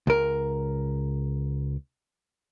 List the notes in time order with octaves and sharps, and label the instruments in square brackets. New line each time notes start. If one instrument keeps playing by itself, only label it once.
[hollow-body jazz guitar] C#2 A#4